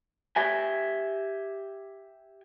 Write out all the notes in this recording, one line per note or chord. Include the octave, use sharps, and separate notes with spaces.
G4 E5 G#5